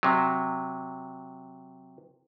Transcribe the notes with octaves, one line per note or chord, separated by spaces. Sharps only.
C3 F#3